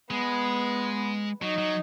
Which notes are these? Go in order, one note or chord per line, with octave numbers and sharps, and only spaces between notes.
G#3 B3
F#3 D#4
F#3